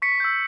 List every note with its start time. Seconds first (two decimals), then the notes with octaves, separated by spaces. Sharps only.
0.02 C#6 B6 C#7
0.20 E6 G6